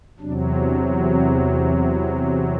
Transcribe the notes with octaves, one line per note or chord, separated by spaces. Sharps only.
E2 C3 F#3 D4
D4
C4
C4
E4